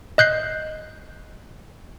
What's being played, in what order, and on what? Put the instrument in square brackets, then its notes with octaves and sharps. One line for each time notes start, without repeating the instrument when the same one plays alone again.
[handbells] D#5 F#6 G6 C7